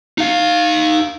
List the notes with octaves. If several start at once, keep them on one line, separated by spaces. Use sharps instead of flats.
D#4 F5